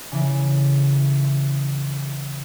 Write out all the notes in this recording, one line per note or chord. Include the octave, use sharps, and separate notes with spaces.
C#3 E3